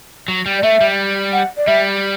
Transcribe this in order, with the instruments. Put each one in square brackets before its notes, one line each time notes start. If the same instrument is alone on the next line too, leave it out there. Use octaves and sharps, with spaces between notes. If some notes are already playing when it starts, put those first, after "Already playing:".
[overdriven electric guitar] F#3
G3
[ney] D5
[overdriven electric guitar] A3 [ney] E5
[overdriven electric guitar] G3
[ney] F#5
D5
[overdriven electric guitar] G3 [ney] E5